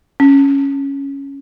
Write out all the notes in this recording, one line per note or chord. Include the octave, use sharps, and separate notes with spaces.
C#4